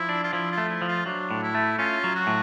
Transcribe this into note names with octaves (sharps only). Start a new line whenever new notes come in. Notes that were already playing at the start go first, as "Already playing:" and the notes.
Already playing: F3 E4
D4
F4
F3 E4
F4
A3
E4
F3
F4
F#3 D4
A2
E4
A3
C#4 F4
F#3
F#4
A2